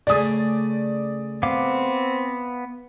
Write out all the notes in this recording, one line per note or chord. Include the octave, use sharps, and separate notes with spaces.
C#3 A3 G#4 D5 D#6
B3 C4 F5 D6